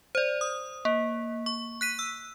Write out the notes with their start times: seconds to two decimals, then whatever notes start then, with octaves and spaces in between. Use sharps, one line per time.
0.15 C5 D5
0.41 D#6
0.85 A#3
1.46 C#6
1.81 F#6 B6 D#7
1.99 E6